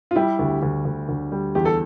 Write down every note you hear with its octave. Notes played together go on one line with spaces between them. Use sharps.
F4
G3 E4 G4
D2
D2
D2
D2
G3
E2 G4
A4